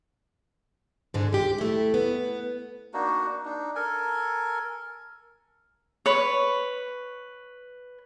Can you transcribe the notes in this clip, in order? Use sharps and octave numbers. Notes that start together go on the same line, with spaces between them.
G#2 D3 G#3
G#3 G4
A3 E4
B3
A#3 D4 D#4 F#4
D4 D#4
A4 A#4 G#5
B4 C#5